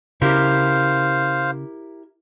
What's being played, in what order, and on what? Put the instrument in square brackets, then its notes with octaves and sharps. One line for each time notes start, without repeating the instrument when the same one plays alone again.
[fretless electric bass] C#3 [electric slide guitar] E4 G4 A#4 [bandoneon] C5 F5